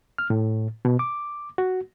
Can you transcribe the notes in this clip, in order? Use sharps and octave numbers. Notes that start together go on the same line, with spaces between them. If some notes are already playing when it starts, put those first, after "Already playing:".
F6
A2
B2
D6
F#4